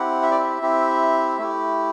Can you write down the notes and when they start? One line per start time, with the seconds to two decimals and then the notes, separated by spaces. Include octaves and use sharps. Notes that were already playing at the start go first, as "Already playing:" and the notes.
Already playing: C4 E4 G4 F#5
0.22 E5
0.31 D5
0.39 E5
0.61 C4 E4 G4
1.38 A3 E4 G4